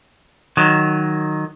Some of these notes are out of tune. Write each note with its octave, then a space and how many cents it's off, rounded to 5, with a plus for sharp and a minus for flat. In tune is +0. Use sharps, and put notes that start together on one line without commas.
D#3 -5 F#3 +0